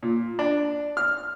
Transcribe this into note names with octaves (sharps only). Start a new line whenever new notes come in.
A#2
D4
F6